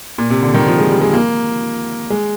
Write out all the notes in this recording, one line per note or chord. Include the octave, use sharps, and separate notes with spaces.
A#2
C3
D3
D#3
F3
G#3
G3
G#3
A#3
G#3